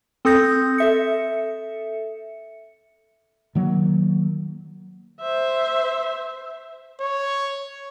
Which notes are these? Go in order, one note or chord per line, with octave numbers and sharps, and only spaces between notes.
C4 A4 D#6 G6 A#6
A4 E5 C#7
D#3 F#3 A#3
C5 E5
C#5